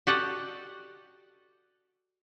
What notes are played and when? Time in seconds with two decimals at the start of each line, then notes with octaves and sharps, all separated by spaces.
0.07 F#4 G4 A4 D5 D#5 F#5